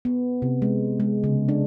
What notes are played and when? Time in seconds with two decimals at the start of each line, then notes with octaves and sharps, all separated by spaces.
0.05 B3
0.42 C3
0.62 G#3
1.00 G#3
1.24 C#3
1.49 D4